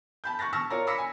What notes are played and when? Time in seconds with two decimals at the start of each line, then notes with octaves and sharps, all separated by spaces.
0.24 A5 B5 G6
0.39 C#6 F#6 A6 A#6
0.53 A5 C#6 E6 F6 A#6
0.70 F4 A#4 C#5 D5 A#5
0.87 B5 D6 E6 A#6 B6 C#7
0.98 G#5